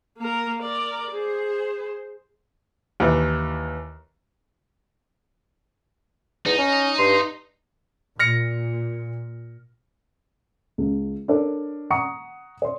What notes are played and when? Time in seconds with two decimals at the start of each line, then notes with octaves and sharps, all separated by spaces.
0.17 A#3 A#4
0.62 A#4 D5
1.11 G#4 C5
3.00 D#2 E3
6.46 E2 D#4
6.58 C#4
6.99 G2 C6
8.19 A#2 F6 A#6 C#7
10.78 C#2
11.28 D4 A4 A#4 C#5 D5
11.90 F#5 A#5 C#6 D#6 C#7
12.62 C#5 C6